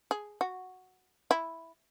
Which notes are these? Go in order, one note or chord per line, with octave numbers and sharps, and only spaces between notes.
G#4
F#4
E4